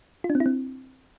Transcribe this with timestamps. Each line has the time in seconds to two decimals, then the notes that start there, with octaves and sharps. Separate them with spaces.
0.24 F4
0.30 D4
0.35 C4
0.40 E4
0.46 C4